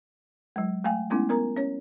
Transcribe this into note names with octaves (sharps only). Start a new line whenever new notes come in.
F#3 G#3
A3 F5 G5 G#5
G#3 A3 B3 C#4 D#4 E4
B3 A#4 A#5
C#4 C#5